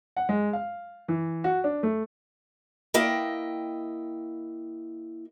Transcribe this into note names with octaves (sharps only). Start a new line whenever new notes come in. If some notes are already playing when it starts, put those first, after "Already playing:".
F#5
G#3
F5
E3
F#4
D4
A3
A#3 E4 D#5 G5